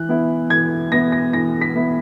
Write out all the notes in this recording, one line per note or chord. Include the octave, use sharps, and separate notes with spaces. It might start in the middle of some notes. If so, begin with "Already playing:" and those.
Already playing: E3 F#6
B3 E4
E3 G#6
B3 E4 A#6
A#6
E3 A#6
B6
B3 E4